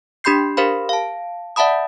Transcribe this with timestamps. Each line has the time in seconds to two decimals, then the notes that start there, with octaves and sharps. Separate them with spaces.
0.24 D4 G4 B5 C6 G6 C7
0.57 G4 A#4 C5 F5 B5
0.89 F5 A5
1.56 D5 E5 F#5 A5 B5 D#6